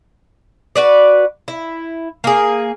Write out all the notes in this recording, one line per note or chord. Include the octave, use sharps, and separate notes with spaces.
F#4 B4 D5
E4
A#3 G#4